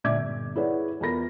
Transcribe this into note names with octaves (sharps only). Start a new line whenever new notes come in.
A#2 D3 D5 E5 D6 G#6
G1
E4 G#4 B4 C#5 D5 F#5
E2 F4 A#4 B5 A#6